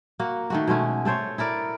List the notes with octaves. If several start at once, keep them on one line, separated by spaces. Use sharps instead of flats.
A#3 F#4
D#3 A3 F#4
B2 G#3 A3 C#4
A3 A4 C5 C#5
E4 A4 A#4 D5